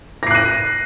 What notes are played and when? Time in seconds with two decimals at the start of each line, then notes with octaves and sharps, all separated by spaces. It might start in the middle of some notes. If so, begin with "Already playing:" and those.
0.23 A#6
0.27 C7
0.31 F#6
0.35 D#7